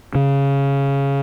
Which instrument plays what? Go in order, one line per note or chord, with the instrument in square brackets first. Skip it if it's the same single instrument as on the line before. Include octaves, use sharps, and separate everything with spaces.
[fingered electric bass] C#3